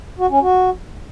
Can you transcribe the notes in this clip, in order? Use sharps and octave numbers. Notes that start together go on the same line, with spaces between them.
F#4
C#4
F#4